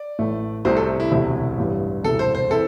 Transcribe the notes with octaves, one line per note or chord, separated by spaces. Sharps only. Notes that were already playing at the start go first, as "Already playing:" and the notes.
Already playing: D5
A1 A2 A3
C2 C3 A3 C4 C5
A4
E4
E1 D2 C3 A3 E4
A1 G2 G3
E1 D2 C3 G3 E4 A4
C5
C5
E3 C4 E4 A4